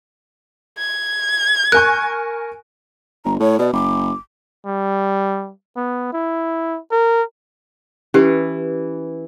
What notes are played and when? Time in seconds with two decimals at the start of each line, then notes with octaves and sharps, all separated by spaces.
0.79 G#6
1.72 A#4 G#5 C#6 F#6
3.25 G1 A#5
3.40 A2 C#5
3.59 B2 D5
3.73 F#1 D6
4.66 G3
5.76 B3
6.13 E4
6.92 A#4
8.14 E3 C#4 G4 B4